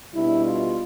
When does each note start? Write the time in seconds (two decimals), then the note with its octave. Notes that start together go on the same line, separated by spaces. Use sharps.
0.14 B2 G3 D4 E4
0.45 F4